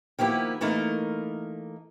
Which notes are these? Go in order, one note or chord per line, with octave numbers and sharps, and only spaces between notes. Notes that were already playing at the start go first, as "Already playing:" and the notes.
D#3 F3 A#3 B3 E4 G4
E3 A3 A#3 D#4 A#4